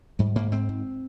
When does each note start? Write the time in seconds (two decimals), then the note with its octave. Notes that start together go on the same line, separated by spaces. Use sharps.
0.19 G#2 G3
0.35 G#2 A#3
0.52 G#2 C4
0.69 G#2